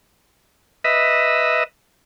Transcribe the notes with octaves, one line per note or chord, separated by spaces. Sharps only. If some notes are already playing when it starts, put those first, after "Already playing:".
B4 D#5 E5